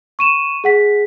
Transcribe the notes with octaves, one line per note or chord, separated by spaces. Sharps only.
C#6 D#7 E7
G#4 F#5 B6